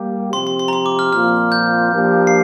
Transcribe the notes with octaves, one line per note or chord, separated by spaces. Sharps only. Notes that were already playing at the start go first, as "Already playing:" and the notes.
Already playing: G3 A#3 G4
C3 F3 C4 G4 C6
C6
C6
A#5
C6
D6
F6
A#2 F3 C4 F4 F6
G6
F3 A#3 D4 G4
C7